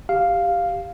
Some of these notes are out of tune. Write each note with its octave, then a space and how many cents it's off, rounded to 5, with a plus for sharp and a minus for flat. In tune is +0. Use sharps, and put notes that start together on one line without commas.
G4 +0 F5 +0